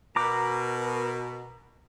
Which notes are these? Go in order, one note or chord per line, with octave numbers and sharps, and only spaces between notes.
B2 A#4 A#5 D6